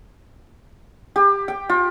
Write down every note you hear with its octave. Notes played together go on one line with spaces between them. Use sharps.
G4
G5
F4